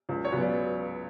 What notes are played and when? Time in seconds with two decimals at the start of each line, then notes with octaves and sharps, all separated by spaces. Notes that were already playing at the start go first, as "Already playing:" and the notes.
0.09 C#2
0.25 C#5
0.32 C#3 F#3 B3
0.41 D5